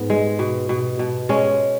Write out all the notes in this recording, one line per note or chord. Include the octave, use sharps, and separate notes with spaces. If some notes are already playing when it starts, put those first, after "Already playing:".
Already playing: G#2 B3
G#3
B2
B2
B2
G#3 C#4